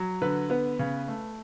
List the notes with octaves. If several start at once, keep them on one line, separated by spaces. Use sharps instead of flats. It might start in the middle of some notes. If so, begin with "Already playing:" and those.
Already playing: F#3
D3 B4
B3 B4
C#3
A3